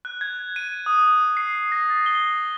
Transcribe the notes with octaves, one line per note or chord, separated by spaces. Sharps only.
F#6
G#6
D#7
D#6
C7
A#6
A6
G7